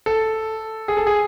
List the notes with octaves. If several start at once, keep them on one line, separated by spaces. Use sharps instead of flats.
A4
G#4
A4
G#4